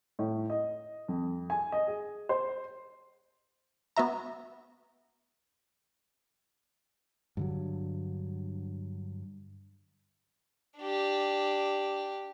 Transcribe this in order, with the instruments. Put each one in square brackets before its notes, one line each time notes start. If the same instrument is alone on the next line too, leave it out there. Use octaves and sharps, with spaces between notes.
[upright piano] A2
D#5
F2
G#5
D#5
G#4
C5
[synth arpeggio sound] B3 F#4 E5 A#5
[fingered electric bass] G2 D3 F#3
[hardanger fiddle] D4 G4